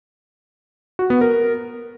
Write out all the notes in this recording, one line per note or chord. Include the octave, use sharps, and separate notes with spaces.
F#4
B3
A#4